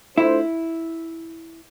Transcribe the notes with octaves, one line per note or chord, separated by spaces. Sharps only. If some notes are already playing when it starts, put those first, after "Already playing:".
A3 D4 E4 F4 A4 C5